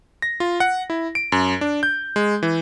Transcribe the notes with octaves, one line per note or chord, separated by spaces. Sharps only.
A#6
F4
F#5
E4
D7
F#2
D4
G6
G#3
E3